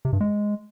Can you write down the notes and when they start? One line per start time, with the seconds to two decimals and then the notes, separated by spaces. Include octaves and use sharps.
0.05 C3
0.13 G2
0.21 G#3